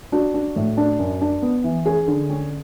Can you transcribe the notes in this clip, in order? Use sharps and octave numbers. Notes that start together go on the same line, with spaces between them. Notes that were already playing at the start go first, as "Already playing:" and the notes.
D4 F#4
D4
A2
D4
F#2
D4
B3
E3
C#4 G#4
D3
C#4